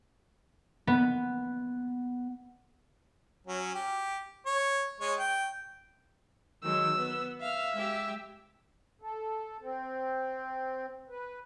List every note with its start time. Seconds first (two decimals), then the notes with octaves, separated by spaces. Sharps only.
0.87 B3
3.47 F#3 C#4
3.74 G4
4.46 C#5
5.00 G#3 C#5
5.19 G5
6.63 D#3 F#3 G#3 E6
6.96 B3
7.41 E5 F5 F6
7.74 G#3 G4
9.02 A4
9.61 C4
11.09 B4